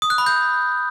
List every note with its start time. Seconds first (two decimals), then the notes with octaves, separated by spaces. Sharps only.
0.02 D#6
0.10 F#6
0.18 B5
0.26 G6